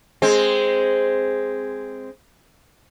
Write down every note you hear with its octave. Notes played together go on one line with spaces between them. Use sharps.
G#3 C4